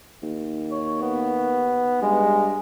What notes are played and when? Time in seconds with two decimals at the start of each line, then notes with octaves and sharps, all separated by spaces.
0.23 D#2
0.71 C#5
1.02 B3
2.02 G2 G#3